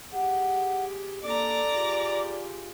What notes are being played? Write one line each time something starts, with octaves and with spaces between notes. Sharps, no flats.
G4 G#4 F#5
A#3 D4 A4 D5 A#5 D6
F4 G4 G#4